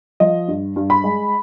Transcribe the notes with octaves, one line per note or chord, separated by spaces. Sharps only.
F3 D#5
G2
G2
B5
G#3